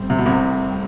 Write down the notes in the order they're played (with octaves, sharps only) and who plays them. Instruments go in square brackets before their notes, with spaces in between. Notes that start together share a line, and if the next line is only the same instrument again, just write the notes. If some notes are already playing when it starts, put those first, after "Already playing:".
Already playing: [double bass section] A2 G3 C4
[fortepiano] C3
B2
C2 C3